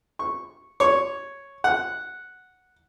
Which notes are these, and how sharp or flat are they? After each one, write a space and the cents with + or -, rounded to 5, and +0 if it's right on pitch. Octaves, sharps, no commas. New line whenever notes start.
C#6 -10
C#5 +0
F#5 -5